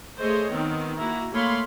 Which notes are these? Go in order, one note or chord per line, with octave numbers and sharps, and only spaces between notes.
A3 G#4 C5 C#5 D#5
D#3 B3 C4
A#3 E4 F#4 A#5
A3 A#3 C#5 F5 B5 C6